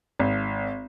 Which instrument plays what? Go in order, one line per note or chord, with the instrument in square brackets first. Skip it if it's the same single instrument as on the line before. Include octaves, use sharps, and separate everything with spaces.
[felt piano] G#1